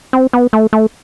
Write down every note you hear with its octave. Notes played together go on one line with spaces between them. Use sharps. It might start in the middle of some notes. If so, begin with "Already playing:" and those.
C4
B3
A3
A3